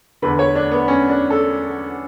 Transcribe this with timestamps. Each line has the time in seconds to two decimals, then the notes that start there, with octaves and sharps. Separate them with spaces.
0.22 E2 D3 B4
0.39 C#5
0.55 D4
0.71 B3
0.88 C#4
1.09 D4
1.30 A4